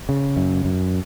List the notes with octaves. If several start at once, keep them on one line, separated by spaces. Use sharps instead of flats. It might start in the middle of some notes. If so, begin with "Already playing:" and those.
C#3
F#2
F#2